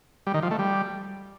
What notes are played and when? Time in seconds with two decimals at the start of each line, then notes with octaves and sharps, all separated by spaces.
0.27 G3
0.34 D#3
0.43 F3
0.51 A3
0.59 G3